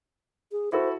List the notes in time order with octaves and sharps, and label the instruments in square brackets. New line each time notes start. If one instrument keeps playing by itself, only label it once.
[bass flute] G#4
[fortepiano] E4 F#4 A4 [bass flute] C5